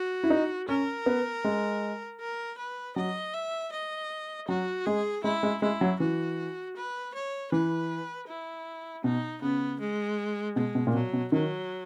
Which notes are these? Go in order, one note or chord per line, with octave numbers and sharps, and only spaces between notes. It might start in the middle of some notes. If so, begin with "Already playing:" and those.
Already playing: F#4
E4
D#4
C#4 A#4
B3
G#3
A#4
B4
F#3 D#5
E5
D#5
F#3 F#4
G#3 G#4
G#3 E4
G#3
G#3 E4
F#3
E3 F#4
B4
C#5
E3 B4
E4
B2 D#4
C#3 B3
G#3
B2 G#3
B2
A#2
B2 F#3
B2
D#3 F#3